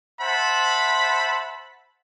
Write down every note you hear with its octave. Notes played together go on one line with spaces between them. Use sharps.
C5 E5 F#5 A5 B5